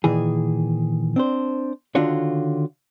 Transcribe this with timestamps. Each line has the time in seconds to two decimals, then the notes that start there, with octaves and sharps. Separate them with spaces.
0.04 A#2 D#3 E3 G#4
1.16 C4 D4 C5
1.95 D3 D#3 D4 F4 F#4 C#5